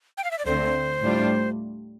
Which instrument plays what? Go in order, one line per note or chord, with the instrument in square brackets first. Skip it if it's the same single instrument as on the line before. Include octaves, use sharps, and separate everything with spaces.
[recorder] G5
F5
E5
D5
[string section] D2 D3 A3 C4 [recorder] C5
[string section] A2 G3 D4 F4